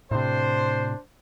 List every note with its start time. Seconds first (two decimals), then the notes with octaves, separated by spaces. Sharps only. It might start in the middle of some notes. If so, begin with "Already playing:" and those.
0.11 A2 C3 D4 C5